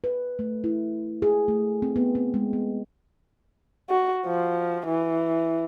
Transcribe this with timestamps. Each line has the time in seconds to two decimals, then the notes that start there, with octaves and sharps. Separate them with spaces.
0.04 B4
0.39 A3
0.64 E4
1.22 G#4
1.48 A3
1.82 C4
1.96 B3
2.15 C4
2.34 G#3
2.53 B3
3.90 F#4
4.27 F3
4.87 E3